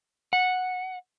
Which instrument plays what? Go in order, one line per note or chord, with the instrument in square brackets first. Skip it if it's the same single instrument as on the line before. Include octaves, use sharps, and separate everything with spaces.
[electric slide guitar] F#5